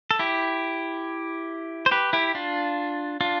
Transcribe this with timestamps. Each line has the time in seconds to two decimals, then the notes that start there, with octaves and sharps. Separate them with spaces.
0.11 A4
0.19 E4 G4
1.86 C5
1.91 G4 B4
2.13 E4 G4
2.35 D4 F4
3.21 D4 F4